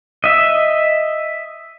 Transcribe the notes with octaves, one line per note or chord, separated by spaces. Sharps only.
D#5 E5